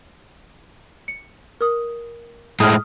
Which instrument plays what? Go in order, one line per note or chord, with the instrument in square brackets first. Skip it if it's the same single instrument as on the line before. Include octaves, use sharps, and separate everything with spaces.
[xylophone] C#7
A#4 D#6
[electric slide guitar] A2 G#3 A3 [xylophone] D#6 F6